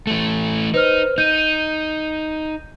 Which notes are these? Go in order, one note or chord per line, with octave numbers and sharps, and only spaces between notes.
E3 A3
D#4 B4 C5 F6
D#4 G6 D#7